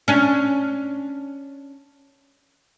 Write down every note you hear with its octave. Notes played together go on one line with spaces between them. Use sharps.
C#4 D4